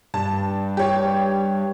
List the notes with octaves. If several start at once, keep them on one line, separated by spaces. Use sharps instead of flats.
G2 A5
G4 C#5